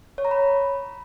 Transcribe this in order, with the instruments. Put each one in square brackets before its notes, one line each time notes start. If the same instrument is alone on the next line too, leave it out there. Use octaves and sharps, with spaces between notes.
[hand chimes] C#5
A#5
B5